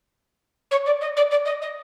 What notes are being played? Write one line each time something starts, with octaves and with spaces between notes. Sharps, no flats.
C#5
D5
D#5
D5
D5
D#5
D#5